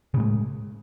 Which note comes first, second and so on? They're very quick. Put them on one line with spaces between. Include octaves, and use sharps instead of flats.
C#3 A2 G#3